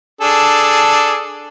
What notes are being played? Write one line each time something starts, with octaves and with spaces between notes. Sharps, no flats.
D4 G#4 A4